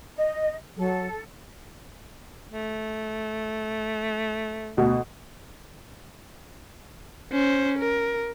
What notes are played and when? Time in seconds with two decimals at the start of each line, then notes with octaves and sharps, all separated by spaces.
0.15 D#5
0.77 F#3 A4
2.51 A3
4.77 D2 B2 F#4
7.32 C#4 C5
7.79 A#4